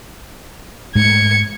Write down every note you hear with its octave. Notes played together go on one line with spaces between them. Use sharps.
G#2 G#3 A3 G#6 C#7